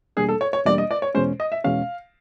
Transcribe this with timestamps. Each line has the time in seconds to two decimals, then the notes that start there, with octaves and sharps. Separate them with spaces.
0.17 E2 B2 G3 A#3 D4 G#4
0.29 A4
0.41 C#5
0.53 C#5
0.66 E2 B2 G3 A#3 D4 D5
0.78 D#5
0.91 D5
1.02 C#5
1.15 E2 B2 G#3 C#4 C5
1.40 D#5
1.52 E5
1.64 E2 B2 G#3 C#4 F5